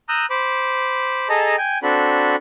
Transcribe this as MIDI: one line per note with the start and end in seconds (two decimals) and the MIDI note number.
0.09 0.26 82
0.09 0.26 87
0.09 0.26 88
0.09 0.26 90
0.09 0.26 91
0.30 1.28 72
0.30 1.28 83
0.30 1.28 86
1.29 1.56 68
1.29 1.56 69
1.29 1.56 75
1.29 1.56 81
1.29 1.56 82
1.58 1.78 79
1.58 1.78 80
1.83 2.36 60
1.83 2.36 62
1.83 2.36 66
1.83 2.36 69
1.83 2.36 83